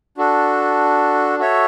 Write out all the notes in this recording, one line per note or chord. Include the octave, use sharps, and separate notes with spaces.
D4 F#4 A4
F#4 A4 C#5 E5